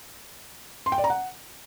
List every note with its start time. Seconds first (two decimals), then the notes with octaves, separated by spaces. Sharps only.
0.86 C6
0.92 G5
0.98 D5
1.04 A#5
1.10 F#5